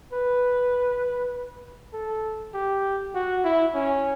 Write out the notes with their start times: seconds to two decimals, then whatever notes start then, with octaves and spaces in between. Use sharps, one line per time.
0.13 B4
1.94 A4
2.54 G4
3.15 F#4
3.45 E4
3.75 C#4